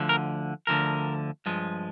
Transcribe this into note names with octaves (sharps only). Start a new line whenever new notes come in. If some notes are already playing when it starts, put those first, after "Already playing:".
Already playing: D2 D3 F3
A#4
D2 D3 F3 A#4
G2 F3 G#3